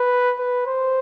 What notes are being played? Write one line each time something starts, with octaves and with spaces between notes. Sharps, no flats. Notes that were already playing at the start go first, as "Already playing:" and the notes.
Already playing: B4
B4
C5